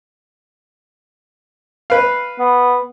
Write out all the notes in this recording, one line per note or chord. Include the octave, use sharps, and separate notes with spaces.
B4 F5
B3